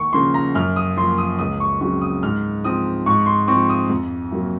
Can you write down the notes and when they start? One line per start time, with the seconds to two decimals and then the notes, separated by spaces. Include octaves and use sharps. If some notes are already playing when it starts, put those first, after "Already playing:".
Already playing: D#2 C#6
0.13 C#3 F3 A#3 C6
0.34 A#5
0.55 F#2 F6
0.76 D#6
0.97 F3 A#3 C6
1.18 D#6
1.39 C#2 D#6
1.60 C#6
1.81 C#3 F#3 C4 C#6
2.01 D#6
2.22 G#2 F6
2.64 F3 C4 D#6
3.06 G#2 C#6
3.26 C6
3.48 F3 C4 C#6
3.69 D#6
3.89 F2
4.31 C3 F#3 A#3